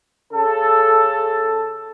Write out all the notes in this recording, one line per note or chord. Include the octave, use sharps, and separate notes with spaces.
C#3 A4